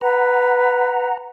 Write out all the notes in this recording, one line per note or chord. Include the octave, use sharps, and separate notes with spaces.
B4 F#5 A#5